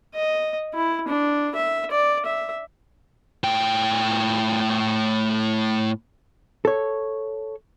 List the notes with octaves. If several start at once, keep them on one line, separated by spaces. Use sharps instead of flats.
D#5
E4
D4
E5
D5
E5
A2 G5
A4 C#5